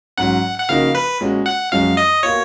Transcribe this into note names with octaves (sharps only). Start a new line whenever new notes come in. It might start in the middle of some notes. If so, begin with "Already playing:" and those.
G#2 F#3 C#4 F#5
F#5
C#3 F3 A#3 D#4 F#4 F5
B4
A#2 G#3 C#4 F#4
F#5
F#2 F3 G#3 C#4 F#4 F5
D#5
B2 A#3 F4 C#5